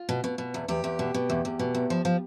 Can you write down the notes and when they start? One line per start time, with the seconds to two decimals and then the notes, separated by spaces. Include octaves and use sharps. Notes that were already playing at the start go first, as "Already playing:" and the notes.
Already playing: F4
0.09 B2
0.24 B2
0.38 B2
0.54 E2
0.68 E2 G4
0.84 E2
0.99 B2
1.14 B2
1.30 E2
1.45 E2
1.59 B2
1.75 E2
1.90 F3
2.05 F3